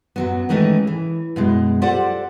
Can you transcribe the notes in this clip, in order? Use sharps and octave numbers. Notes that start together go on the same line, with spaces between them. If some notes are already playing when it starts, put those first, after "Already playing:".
F#2 F#3 B3
D#3 E3 G#3 A3 C#4
E3
F#2 B2 G#3
F4 G4 A4 C5 D5 F#5